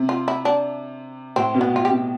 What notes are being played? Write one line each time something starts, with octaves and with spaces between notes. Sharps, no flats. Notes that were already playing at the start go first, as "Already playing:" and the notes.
Already playing: C3
F4
E4
D4
A2 C4
B2
B3
A2 F4
G4
B2